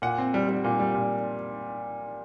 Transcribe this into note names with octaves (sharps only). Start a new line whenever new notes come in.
A#2 F#5
C4
G3
G3
A#2
G3
A#2